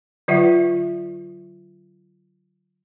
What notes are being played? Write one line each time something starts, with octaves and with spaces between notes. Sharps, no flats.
D3 F#3 F4 E5 F#5